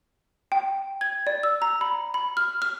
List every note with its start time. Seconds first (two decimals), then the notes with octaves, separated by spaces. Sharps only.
0.52 G5
1.01 G#6
1.27 D5
1.43 E6
1.62 A#5
1.81 B5
2.14 B5
2.37 F6
2.62 F6